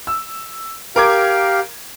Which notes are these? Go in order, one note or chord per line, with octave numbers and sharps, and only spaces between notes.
E6
G4 A#4 F5 D6 G#6